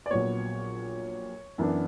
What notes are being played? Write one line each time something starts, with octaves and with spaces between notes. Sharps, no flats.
D5
A#1 A#2 F#3 B3 C#5
F#2 E3 B3 D4